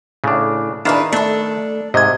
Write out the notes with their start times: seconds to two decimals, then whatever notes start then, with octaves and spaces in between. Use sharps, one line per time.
0.24 A2 C#3 D4
0.85 D#3 D4 E4 G#4 B4 F5 A5
1.12 A3 D4 A4
1.94 G#2 C3 D#5 G#6